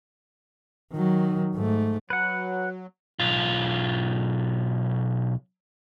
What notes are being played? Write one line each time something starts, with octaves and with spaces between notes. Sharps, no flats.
D#3 F#3
G#2 A3
F#3 B4 F#5
B1 F4